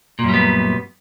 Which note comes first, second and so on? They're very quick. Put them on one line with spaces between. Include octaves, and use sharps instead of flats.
A#2 F#2 G3 B3